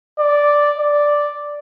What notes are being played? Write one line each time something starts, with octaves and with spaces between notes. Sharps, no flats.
D5
D5